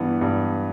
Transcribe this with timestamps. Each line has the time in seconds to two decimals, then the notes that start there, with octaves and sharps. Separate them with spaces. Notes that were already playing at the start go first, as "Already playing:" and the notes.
Already playing: G2 E3 B3
0.21 G2